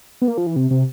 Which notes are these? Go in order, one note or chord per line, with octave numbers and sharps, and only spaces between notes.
B3
A#3
F3
E3
C3
C3